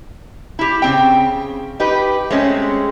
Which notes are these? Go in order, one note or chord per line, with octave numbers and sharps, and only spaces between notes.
E4 G4
C#3 C4 G5
D#4 G4 B4
G#3 A3 C4 C#4